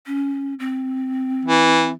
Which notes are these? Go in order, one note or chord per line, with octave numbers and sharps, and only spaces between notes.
C#4
C4
E3